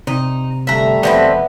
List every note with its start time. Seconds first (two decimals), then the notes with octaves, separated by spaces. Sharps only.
0.07 C3 D#4
0.67 G1 G3 A3 E5 A#5
1.03 E1 D3 B3 C4 B4 E5